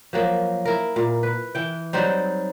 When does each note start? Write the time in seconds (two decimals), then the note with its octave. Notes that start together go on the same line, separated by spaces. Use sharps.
0.13 F3 F#3 A#3
0.65 E4 A#4
0.96 A#2
1.23 B4
1.55 E3 G5
1.93 F#3 G3 C4 D#4